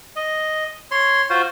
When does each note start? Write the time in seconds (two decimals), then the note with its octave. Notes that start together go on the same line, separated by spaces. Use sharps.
0.16 D#5
0.91 C#5 C6
1.30 F4 F#4 C5